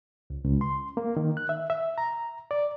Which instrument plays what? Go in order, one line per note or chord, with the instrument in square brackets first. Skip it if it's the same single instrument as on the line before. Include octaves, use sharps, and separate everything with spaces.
[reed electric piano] C#2
C#2
C6
A#3
D#3
F#6
E5
E5
A#5
D5